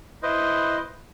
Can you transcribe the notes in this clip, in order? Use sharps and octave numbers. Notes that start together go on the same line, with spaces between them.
E4 B4 C5 D#5